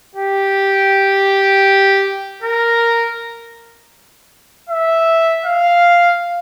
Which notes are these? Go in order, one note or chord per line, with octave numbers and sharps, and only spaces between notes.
G4
A#4
E5
F5